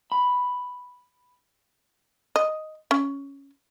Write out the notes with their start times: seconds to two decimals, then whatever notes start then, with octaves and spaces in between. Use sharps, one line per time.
0.12 B5
2.36 D#5
2.91 C#4